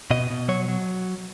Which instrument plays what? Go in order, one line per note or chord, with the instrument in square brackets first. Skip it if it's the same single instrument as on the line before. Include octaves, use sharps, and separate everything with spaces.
[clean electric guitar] B2 D#5
B2
F#3 C#5
F#3